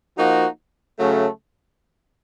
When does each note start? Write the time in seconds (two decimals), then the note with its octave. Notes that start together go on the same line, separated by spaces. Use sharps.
0.17 F3 A#3 D#4 F#4
0.99 C#3 F#3 A3